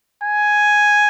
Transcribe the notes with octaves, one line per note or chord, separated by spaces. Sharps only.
G#5